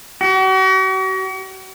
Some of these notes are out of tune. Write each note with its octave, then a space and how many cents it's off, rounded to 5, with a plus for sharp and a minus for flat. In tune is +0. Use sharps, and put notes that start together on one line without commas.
F#4 +40